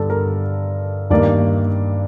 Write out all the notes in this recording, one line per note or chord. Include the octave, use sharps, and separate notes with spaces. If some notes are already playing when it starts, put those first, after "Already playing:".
Already playing: G2 D3 G3 A4
A#4
G2 D#3 A#3 D5